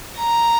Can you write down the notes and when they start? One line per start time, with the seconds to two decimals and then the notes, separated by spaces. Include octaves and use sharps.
0.19 A#5